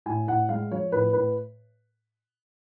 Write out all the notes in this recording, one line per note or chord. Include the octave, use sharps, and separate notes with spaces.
A2 G#5
A2 F#5
G#3 F5
F3 C#5
A2 B4
A2 B4